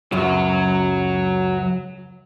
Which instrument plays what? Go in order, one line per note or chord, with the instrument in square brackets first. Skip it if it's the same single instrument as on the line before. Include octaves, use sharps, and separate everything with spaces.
[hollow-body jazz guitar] C#2 F#2 [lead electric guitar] F#3 F#4